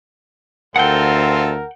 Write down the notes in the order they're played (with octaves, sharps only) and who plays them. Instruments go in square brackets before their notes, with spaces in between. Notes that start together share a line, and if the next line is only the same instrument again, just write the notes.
[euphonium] D2 [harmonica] C4 F4 A4 [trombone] A#4 [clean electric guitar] F#5 G5